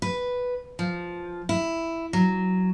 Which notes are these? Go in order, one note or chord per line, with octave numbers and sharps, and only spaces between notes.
B4
F3
E4
F#3